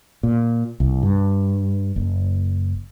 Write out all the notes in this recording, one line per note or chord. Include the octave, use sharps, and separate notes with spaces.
A#2
C2
G2
F#1